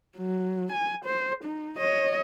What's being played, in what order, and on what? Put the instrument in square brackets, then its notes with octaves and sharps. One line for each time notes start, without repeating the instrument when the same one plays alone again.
[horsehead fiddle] F#3
G#5
C5
D#4
C#5 D#5